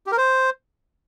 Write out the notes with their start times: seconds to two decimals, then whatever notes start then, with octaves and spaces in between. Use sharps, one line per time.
0.06 G4
0.12 A#4
0.17 C5